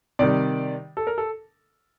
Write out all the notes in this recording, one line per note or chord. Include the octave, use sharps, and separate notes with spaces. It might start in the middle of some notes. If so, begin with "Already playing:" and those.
C3 D#3 G3 D5
A4
A#4
A4